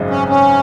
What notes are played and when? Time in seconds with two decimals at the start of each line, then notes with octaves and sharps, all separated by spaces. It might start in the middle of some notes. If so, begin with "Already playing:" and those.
Already playing: G#1 F#2 C#3 G#3 D#4
0.10 C#4
0.29 C#4